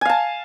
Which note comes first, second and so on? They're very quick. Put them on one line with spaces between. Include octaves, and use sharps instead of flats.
G#5 F5 A5